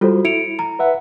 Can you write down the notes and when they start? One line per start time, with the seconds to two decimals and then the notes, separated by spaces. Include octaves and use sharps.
0.01 G3 F4 F#4 A4 C5
0.25 E4 C#7 D7 F7
0.59 A#5
0.79 B4 E5 F#5